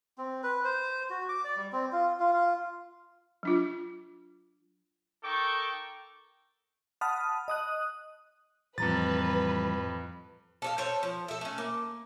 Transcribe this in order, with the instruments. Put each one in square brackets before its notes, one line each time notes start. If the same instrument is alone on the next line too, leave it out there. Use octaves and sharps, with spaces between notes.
[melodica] C4
B4
C5
F#4
D6
D5
G3
C4
F4
F4
F4
[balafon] F#3 D4 F4
[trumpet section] D#4 A4 A#4 G5 C#6 D6
[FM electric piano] F#5 A5 B5 D#6 F6
D#5 D#6 F#6
[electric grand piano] F2 A#5 A6 [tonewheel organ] A2 E3 G3 [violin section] B4
[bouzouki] A4 C#5 F5
A4 C5 C#5
F3
A4 E5
A3 C#4
A#3